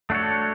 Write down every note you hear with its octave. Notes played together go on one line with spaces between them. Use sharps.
A3 D4 F#4 A4 C#5